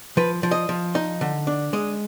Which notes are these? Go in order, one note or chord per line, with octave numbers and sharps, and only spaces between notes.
F3 B4
F3
D#5
F3
D#4
D3
D4
G#3 D#5